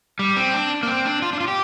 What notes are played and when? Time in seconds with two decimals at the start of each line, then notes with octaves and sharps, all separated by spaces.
0.19 G3
0.37 C4
0.54 D4
0.83 A#3
0.87 C4
1.05 D4
1.22 F4
1.33 D4
1.40 F4
1.48 G4